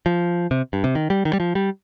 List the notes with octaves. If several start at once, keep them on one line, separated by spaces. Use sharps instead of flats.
F3
C3
G2
C3
D#3
G3
D#3
G3
F3
G3